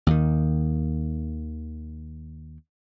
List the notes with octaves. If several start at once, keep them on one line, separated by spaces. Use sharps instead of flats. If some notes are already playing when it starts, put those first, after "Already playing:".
D#2 D#3